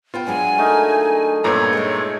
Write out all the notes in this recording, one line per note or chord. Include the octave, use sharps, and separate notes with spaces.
B3 F4 C5 G5
F#3 G#3 D4 G#5
A3 D#4 A#4
G2 A#2 B3 B4 C#5 A#5
G#3 D#4